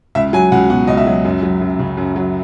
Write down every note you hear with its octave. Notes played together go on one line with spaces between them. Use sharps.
C#2 E5
F#3 G#5
C#2 F#5
B2 F#5
C#2 D#5
E5
F#3
F#2
F#3
F#2
C#3
F#2
F#3